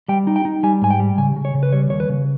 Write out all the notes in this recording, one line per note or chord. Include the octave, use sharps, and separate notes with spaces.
G3 G5
D#4
G5
D#4
G3 G#5
G#2 G#5
G5
G3
C#3 G#5
C#3
C#5
C#3
B4
G3 C#5
D#2 C#5
B4
C#3